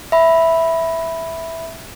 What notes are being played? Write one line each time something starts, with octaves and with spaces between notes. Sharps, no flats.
E5 B5